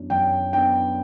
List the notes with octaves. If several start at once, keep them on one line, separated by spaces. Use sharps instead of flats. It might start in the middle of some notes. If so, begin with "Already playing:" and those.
Already playing: F#2 F#3 B3 D4
F#2 G5
B3 D4 G5